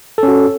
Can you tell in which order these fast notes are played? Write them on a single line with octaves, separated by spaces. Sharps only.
A4 C#4 F#4